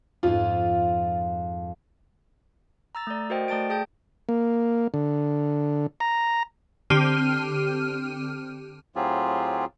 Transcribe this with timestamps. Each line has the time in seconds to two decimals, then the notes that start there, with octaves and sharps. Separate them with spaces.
0.23 F2 G#2 F4
2.95 A#5 E6 A6
3.07 A3 D5
3.30 F#4 A#4 C5 D#5 G5
3.48 A3 D5 A5 A6 D7
3.70 G#4 G5 A5 G6
4.29 A#3
4.94 D3
6.00 A#5
6.90 D3 C4 G4 F6 D#7
8.96 A2 F#3 C4 F4 G4 G#4